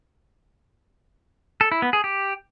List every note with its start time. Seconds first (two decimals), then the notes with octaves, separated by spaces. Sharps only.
1.61 A4
1.72 E4
1.82 B3
1.93 G#4
2.04 G4